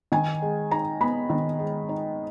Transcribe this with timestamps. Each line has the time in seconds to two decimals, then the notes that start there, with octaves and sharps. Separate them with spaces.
0.12 D#3 G#5
0.42 G#3
0.71 D#4 A#5
1.01 B3 B5
1.30 D#3
1.59 G#3
1.89 D#4